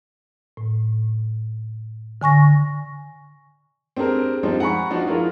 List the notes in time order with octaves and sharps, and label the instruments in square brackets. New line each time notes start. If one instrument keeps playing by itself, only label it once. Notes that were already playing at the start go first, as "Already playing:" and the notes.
[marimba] A2
D3 G#5 C#6 A#6
[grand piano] C4 D4 G4 G#4 A#4
F3 G3 G#3 C4 D4 D#4
F#5 G#5 A#5 B5 C#6
F3 D4 D#4 F#4
E4 F4 G#4 A#4